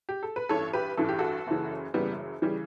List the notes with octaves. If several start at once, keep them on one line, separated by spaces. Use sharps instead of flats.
G4
A4
B4
A1 G2 E3 A4 C#5
G4 B4
A1 G2 E3 A4
G4
F#4 A4
F#1 F#2 C#3 E3
F#1 F#2 C#3 E3 G3 B3
C#3 E3 G3